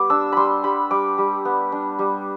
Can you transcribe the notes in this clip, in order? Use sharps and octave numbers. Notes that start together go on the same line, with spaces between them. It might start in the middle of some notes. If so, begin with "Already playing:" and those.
Already playing: G3 B3 D6
D4 E6
G3 B5 C6
G3 B5
G3 D6
G3
B3
D4
G3